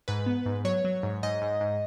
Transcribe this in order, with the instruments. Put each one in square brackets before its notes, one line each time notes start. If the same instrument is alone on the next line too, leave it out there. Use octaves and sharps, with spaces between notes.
[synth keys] G#2 B4
B3
G#2
F#3 C#5
F#3
G#2
G#2 D#5
G#2
G#2